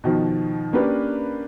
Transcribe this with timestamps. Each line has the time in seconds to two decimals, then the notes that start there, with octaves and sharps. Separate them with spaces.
0.04 B2 D#3 F3
0.73 A#3 C#4 D4 G4 B4